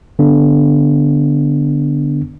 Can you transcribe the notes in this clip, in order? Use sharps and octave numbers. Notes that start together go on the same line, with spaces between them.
D3 B3 D4